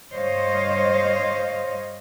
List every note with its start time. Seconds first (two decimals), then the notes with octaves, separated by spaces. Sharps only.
0.14 G2 C5 C#5 D#5 F5